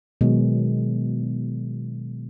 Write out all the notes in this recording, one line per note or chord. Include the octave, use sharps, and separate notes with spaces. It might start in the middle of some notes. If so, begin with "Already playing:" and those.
B2 D#3 F#3 G#3